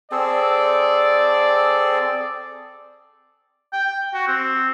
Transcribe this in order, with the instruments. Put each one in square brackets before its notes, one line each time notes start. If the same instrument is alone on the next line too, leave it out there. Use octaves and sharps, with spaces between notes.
[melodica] C4 G#4 A4 [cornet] D5
[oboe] G5
F#4
C4